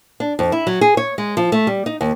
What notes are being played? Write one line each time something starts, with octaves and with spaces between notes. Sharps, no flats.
D4
F2
E4
F#3
G#4
C#5
G#3
F3
A3
G3
D#4
D#2